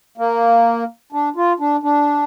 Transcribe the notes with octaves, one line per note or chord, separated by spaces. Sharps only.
A#3
D4
F4
D4
D4